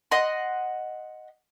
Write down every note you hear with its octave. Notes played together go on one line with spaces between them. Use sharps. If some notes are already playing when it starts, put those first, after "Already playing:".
D#5 F#5 C6